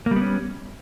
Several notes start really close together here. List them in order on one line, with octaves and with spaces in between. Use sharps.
A#3 G3 B3 C#4